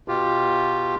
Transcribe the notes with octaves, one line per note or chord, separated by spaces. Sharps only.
B2 F4 G4